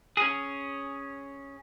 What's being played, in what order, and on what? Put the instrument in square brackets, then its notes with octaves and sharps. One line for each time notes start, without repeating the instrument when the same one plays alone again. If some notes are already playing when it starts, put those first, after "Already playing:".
[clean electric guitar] C#4 G#4